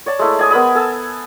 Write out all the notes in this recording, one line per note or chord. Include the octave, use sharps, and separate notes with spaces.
C#5 D5 A5
G#3 A3 E4
D5 G#5 D#6
B3 A#4 B5 D#6
A4 G#5 A5 E6